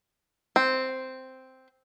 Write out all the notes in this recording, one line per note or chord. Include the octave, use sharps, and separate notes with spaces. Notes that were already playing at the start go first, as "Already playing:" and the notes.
C4